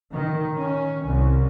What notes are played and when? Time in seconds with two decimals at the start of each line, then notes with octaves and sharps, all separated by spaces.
0.12 D#3
0.59 C#4
1.07 C2